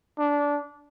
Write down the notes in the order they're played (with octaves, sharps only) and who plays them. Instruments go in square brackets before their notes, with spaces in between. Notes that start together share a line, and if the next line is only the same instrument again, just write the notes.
[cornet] D4